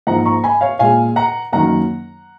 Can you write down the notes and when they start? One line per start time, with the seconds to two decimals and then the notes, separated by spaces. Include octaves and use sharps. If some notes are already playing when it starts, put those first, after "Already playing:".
0.07 G#2 F3 A#3 F#5 A#5
0.26 A#5 C#6
0.44 G#5 B5
0.61 C#5 F5
0.79 A#2 G#3 F5 G#5
1.16 F#5 A#5
1.52 F#2 D#3 F#3 A#3 F#5 A#5